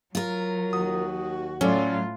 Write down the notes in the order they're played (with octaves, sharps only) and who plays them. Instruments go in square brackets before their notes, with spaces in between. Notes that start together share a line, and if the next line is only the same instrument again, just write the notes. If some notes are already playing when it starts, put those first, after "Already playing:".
[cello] F#3 [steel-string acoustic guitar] F4 A#4
[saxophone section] D#2 F#4 [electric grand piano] D#6
[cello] A2 F4 [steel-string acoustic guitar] F#3 [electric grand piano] C#4 A4 D5